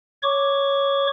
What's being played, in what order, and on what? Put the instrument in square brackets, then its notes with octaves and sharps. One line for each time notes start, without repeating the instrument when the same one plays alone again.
[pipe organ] C#5 C#6 D6